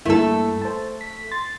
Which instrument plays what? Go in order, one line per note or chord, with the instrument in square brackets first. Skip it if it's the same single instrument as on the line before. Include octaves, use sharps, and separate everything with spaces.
[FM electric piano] G2 A#3 E4 [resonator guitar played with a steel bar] A3 A4
[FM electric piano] C5 A5
B6
C6 A6